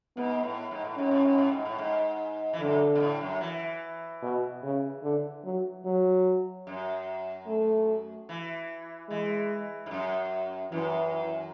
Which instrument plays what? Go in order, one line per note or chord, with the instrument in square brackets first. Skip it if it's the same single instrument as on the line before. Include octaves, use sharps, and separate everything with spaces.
[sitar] G#2 [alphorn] B3
[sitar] A2
G#2
A2
[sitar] G#2 [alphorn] C#4
[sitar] A2
G#2
A2
G#2
A2
G#2
E3
[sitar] F#2 [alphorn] D3
[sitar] B2
A2
F#2
E3
[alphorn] B2
C#3
D3
F#3
F#3
[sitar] F#2
[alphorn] A3
[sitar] E3
[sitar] E3 [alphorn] G#3
[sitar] G#2
F#2
[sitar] F#2 [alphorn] E3